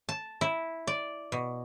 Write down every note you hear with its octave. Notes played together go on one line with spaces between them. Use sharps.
A5
E4
D5
B2